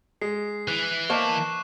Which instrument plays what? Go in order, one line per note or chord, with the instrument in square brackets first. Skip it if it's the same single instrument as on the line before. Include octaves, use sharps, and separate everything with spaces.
[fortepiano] G#3 [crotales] C7
[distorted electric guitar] E3 [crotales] F#6
[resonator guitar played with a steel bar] A#3 C5 A5 [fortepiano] D#5 [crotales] C#6 D6 E7